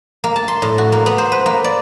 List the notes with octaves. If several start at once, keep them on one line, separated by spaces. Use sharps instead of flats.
A#3
A5
C6
A2
F#4
A#3
B3
C5
B4
A#3
D5